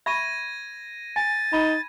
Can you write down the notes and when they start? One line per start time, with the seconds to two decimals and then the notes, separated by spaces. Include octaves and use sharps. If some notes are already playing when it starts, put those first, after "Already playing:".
0.06 E5 B5 C#6 G#6 A#6 D#7
1.16 G#5 A6
1.53 D#4 B5